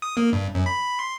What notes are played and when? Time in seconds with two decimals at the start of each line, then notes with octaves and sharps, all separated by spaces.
0.02 D#6
0.17 A#3
0.33 G2
0.55 F#2
0.66 B5
0.99 C6